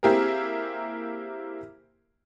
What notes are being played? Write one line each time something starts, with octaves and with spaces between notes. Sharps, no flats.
A#3 C4 E4 G4 G#4 A#4